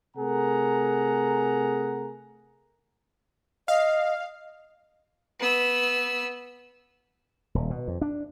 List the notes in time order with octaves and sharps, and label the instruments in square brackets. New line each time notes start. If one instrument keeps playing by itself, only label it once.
[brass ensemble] C3 A3 G#4 A#4 F#5 A#5
[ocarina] D#5 [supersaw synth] F5
[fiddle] B3 E6
[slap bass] D#1
B2
F2
D4